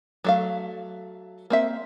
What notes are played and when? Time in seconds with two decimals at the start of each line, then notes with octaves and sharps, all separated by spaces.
0.24 F#3 A3 F5
1.50 A#3 C4 E5